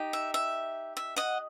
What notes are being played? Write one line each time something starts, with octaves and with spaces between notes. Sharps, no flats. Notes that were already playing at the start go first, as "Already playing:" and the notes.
Already playing: D#4 G4 D#5
E5
E5
E5
D#5 F#5